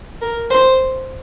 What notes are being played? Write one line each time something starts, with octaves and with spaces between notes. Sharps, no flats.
A#4
C5